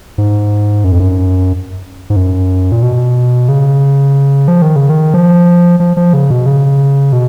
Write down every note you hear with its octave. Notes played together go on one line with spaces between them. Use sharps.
G#2
F#2
F2
F#2
G#2
F#2
A#2
B2
C#3
F3
D#3
C#3
D#3
F3
F3
F3
C#3
B2
C#3
B2